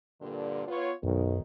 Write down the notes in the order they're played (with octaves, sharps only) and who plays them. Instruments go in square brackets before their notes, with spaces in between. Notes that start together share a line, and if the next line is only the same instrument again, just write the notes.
[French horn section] G2 A#2 D3
B3 F4 C#5
[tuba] B1 [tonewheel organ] F#2 [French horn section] D#3